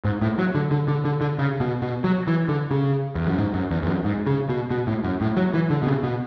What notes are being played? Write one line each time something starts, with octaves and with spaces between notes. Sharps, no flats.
G#2
A2
F#3
D3
D3
D3
D3
D3
C#3
B2
B2
F#3
E3
D3
C#3
E2
F#2
G#2
F#2
E2
E2
F#2
G#2
C#3
B2
B2
A2
F#2
A2
F#3
E3
D3
B2
C#3
B2